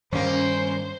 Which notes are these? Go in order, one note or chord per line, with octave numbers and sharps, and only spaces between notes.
G2 D#3 G3 A#3 C#4 C5